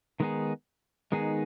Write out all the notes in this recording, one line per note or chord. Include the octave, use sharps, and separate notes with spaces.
D#3 G#3 B3 D#4 G#4
D#3 G#3 B3 D#4 G#4